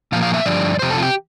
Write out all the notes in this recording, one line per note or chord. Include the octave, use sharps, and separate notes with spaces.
A#2 F3 A#3 F5
F5
E5
G2 D3 F3 D5
F2 C3 C5
A4
F4
G4